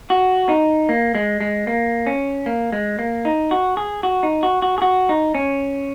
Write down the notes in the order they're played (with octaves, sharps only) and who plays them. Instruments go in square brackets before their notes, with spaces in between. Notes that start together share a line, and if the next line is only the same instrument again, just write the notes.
[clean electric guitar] F#4
D#4
A#3
G#3
G#3
A#3
C#4
A#3
G#3
A#3
D#4
F#4
G#4
F#4
D#4
F#4
F#4
G#4
F#4
D#4
C#4